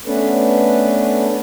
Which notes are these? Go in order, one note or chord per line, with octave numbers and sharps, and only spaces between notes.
A3 B3 C#4 D4 A4 B4